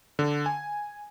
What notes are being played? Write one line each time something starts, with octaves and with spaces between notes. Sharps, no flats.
D3
G#5